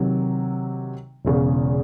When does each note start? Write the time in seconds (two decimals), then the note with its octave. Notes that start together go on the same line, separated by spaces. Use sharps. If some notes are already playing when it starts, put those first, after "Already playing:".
Already playing: C3 D#3 F#3
1.25 E1 E2 C#3